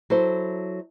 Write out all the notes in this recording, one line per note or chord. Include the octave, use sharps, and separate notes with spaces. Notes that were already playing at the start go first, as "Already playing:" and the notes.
F#3 E4 A4 C5